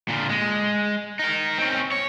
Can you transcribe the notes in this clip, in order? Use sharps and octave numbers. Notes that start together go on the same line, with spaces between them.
A#2 D3
G#3
D#4 A#4
C4 C#4
C#5